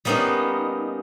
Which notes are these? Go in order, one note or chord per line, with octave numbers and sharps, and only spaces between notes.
G3 A#3 B3 C#4 D#4